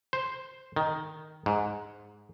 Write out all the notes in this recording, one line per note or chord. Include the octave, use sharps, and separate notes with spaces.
C5
D#3
G#2